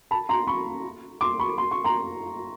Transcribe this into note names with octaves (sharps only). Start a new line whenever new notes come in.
A5 B5
A#5 C6
B5 C#6
C6 D6
B5 C#6
C6
C#6
A#5 C6